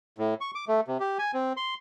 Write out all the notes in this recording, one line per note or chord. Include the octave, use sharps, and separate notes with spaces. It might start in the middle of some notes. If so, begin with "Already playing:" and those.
A2
C#6
D6
A3
C3
G4
G#5
C4
C6